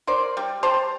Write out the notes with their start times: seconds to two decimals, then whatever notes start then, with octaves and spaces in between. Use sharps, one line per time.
0.07 A#4 C5 D5
0.37 G3
0.63 G4 C5 A5 A#5